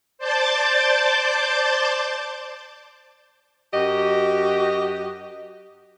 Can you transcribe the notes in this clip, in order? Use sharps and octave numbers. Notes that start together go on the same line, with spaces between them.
C5 D5 A5 D6 G6 A6
F#2 F#4 G4 D#5